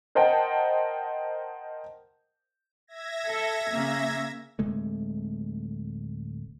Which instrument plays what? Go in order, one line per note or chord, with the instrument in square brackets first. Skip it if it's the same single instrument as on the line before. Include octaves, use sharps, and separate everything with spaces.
[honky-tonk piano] A#4 C5 D#5 F#5 G5 A5
[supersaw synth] E5 G#6 A#6
[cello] A4
C#3 A#3
[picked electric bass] D1 C3 G#3 A3